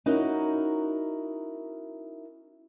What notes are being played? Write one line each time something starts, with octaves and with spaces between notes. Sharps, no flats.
C#4 D#4 E4 F#4 A#4